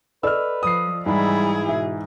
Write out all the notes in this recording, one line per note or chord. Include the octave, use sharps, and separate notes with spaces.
A4 B4 D5 D#5 E6 F6
F3 D#6 C7
G#2 E3 G3 E4 G#4 B5
B2 E5